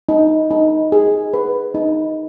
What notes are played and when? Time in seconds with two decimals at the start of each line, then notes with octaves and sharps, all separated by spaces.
0.09 D#4
0.50 D#4
0.92 G#4
1.34 B4
1.74 D#4